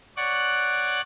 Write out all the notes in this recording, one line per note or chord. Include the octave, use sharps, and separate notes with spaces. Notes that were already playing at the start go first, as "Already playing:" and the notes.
C#5 D5 F#5 C#6 D6 F#6